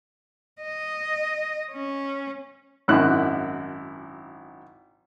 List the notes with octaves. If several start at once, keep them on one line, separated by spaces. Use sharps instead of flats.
D#5
C#4
G#1 F#2 E4 F#6